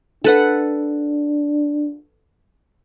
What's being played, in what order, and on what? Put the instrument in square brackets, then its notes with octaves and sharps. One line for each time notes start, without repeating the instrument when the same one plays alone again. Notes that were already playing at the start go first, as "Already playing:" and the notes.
[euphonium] D4 [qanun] A4 B4 F#5